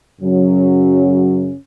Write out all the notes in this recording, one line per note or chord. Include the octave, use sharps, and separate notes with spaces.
F#2 C#3 F#3 C#4